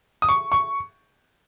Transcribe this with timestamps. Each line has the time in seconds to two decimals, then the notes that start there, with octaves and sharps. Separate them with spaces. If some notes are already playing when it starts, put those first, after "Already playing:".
0.22 D#6
0.29 C#6
0.52 C#6